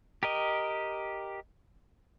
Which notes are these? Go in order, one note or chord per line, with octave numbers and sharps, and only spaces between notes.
G4 A#4 D#5